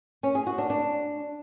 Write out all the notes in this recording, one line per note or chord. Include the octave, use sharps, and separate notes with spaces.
C#4
G#4
F#4
D4
D4